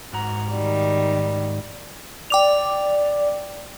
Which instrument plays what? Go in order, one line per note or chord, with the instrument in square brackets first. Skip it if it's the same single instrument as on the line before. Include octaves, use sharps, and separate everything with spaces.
[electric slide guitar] G#2 F#4 A#5
[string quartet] D#3 G3
[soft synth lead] D5 [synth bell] G5 D6 F7